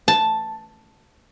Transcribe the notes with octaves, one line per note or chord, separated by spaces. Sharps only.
A5